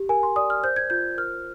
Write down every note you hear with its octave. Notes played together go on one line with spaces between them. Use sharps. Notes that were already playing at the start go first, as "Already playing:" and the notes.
Already playing: G4
A#4 G#5
C6
D5 D#6
F6
C5 G6
G#6
F4 G6
A#4 F6